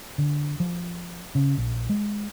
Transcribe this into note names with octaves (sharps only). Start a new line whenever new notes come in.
D3
F3
C#3
A#1
G#3